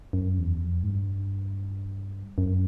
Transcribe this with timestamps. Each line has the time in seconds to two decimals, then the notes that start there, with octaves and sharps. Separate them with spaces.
0.13 F#2
0.39 E2
0.63 F2
0.83 G#2
0.88 G2
2.38 F#2